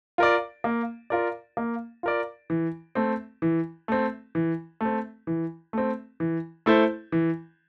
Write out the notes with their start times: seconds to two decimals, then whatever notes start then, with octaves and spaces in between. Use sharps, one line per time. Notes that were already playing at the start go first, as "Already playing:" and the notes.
0.18 F4 A#4 D5
0.64 A#3
1.10 F4 A#4 D5
1.57 A#3
2.03 F4 A#4 D5
2.50 E3
2.95 A3 C4
3.42 E3
3.88 A3 C4
4.35 E3
4.81 A3 C4
5.27 E3
5.73 A3 C4
6.20 E3
6.66 A3 E4 A4 C5
7.12 E3